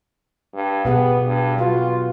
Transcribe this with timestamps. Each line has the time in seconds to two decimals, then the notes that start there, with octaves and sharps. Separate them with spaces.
0.54 G2
0.85 B2 B3 G4 G#4
1.27 G2
1.58 F4 F#4 B4